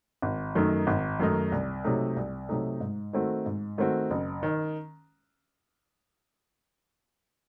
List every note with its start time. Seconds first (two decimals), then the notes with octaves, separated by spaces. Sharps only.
0.22 G#1
0.55 F#2 D#3 A3 D#4
0.87 G#1
1.20 F#2 D#3 A3 D#4
1.52 C2
1.84 C3 F#3 A3 D#4
2.16 C2
2.49 C3 F#3 A3 D#4
2.81 G#2
3.13 D#3 A3 C4 F#4
3.46 G#2
3.78 D#3 A3 C4 F#4
4.10 F#1
4.43 D#3